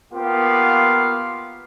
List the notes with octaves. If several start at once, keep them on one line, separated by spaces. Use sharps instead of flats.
A#3 B3 F4 G4 F5